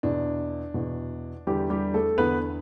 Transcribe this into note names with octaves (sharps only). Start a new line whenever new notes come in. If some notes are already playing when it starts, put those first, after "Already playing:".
E2 B2 D4
E2 B2
E2 D3 G3 G4
G3 G4
A3 A4
E2 D3 B3 B4